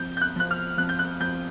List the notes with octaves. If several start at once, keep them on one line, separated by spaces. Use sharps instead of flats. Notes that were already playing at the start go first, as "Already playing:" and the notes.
Already playing: F2 G6
G6
F#6
F3 F#6
F6
F2 F#6
G6
F#6
F2 G6